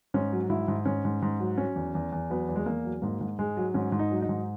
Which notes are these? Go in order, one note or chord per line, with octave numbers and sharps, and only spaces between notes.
G#2 C#4
F#3
G#2 E4
G#2
G#2 C#4
G#2
G#2
F#3
F#3 C#4
E2
E2
E2
F#3 B3
E2
G#3
E2 A#3
F#3
G#2 A#3
G#2
G#2 G#3
F#3
G#2 C#4
G#2
D#4
F#3
D#4
G#2